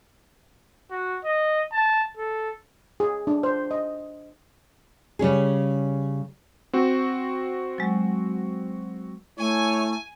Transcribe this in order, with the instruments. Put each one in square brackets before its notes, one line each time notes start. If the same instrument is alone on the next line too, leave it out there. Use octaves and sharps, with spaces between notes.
[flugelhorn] F#4
D#5
A5
A4
[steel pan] G#4
D4
C5
D#5
[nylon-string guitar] C#3 G3 C#4 G#4
[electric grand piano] C4 F#4
[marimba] F#3 G#3
[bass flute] A3 [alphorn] E4 [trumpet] C#5 [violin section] G#5